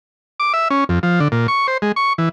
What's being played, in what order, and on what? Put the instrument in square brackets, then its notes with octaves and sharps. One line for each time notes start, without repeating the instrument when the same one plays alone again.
[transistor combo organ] D6
E5
C#4
F2
F3
D3
A#2
C#6
C5
G#3
C#6
E3